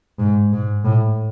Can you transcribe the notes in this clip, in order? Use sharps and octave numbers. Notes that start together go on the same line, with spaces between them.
G#2
G#2
A2